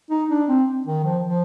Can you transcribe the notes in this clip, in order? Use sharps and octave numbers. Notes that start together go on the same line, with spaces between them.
D#4
D4
C4
D#3
F3
F3